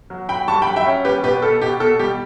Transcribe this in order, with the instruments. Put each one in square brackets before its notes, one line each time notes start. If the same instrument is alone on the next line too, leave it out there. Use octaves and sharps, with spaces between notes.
[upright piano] F#3
F#3 G5 B5
G2 A5 C#6
G5 B5
F#3
E5 G5
C#4
G3 G4 B4
B2 G4 B4
B3 A4
B2 G4
B2 A4
G3 G4